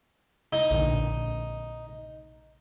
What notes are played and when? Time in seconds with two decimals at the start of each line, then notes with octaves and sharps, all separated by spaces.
0.53 D#4
0.71 A#1 A#2 D3